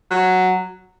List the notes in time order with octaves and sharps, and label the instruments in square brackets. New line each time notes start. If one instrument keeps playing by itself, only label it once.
[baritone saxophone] F#3